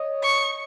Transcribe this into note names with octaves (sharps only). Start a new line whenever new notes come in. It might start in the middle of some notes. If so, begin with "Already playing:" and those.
Already playing: C#5 D#5
C#6